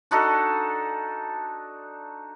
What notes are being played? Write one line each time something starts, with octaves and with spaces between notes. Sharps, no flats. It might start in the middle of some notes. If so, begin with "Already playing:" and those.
D4 D#4 F#4 A4